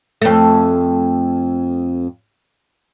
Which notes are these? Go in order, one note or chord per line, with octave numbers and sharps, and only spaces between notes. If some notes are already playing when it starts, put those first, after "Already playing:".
F2 A3